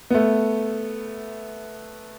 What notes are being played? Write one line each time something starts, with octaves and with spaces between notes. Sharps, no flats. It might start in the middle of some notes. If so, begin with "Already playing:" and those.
A3 B3